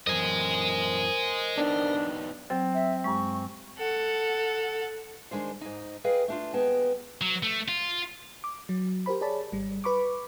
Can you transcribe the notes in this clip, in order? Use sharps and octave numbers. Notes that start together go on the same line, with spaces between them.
F#2 E3 A#4 C5 D#5 G#5
B3 D4 D#4 G4
F#3 C4
E5
G2 G#3 C#6
A4 F#5
D#3 G#3 D4 C5
G#2 D#4
G#4 B4 D#5 F5 G5
A3 D4 F4
D#2 G#3 B3 G5 A5
F#3
A3
F4
D6
F#3
G4 A#4 C5 B5
G#4 C#5 D5 A5 B5
G#1 G3
B4 B5 C#6 D6